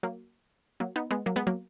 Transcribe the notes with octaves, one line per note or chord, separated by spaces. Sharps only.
F#3 A#3
F#3 A#3
B3 D#4
G#3 B3
F#3 A#3
G#3 B3
F#3 A#3